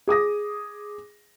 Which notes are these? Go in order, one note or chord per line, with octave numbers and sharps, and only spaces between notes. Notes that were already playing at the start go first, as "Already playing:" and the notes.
G#4 D6 D#6 A#6